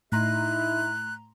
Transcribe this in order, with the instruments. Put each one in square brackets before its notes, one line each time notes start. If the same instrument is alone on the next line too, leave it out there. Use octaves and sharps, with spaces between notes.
[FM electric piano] A2 A#5 C6 [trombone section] D#4 E4 [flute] F#6